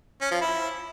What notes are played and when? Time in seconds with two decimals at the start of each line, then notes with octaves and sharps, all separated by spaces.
0.21 C#4
0.31 F3
0.41 E4